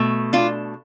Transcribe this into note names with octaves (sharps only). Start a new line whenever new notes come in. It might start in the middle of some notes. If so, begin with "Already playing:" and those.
Already playing: B2 A3
D4 F4